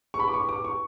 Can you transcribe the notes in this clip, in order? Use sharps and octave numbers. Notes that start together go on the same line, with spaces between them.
C#6
B5
D6
C#6
D6
C#6